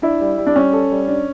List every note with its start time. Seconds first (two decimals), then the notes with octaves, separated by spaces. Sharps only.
0.02 D4 E4
0.21 G3
0.37 G3
0.47 D4
0.56 G3 C#4
0.73 A4
0.91 G3
1.08 D4